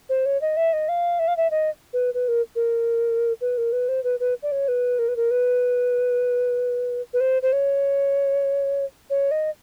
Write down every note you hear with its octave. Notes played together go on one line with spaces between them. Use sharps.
C5
C#5
D#5
E5
D#5
F5
E5
F5
E5
D#5
B4
B4
A#4
A#4
B4
A#4
B4
C5
B4
B4
D5
C#5
B4
A#4
B4
A#4
B4
B4
C5
C5
C#5
C#5
D#5